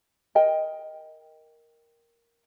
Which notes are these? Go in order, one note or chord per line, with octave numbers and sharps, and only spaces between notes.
A#4 D#5 G5